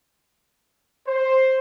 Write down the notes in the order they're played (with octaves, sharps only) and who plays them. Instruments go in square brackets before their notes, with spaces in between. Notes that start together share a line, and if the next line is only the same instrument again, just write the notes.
[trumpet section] C5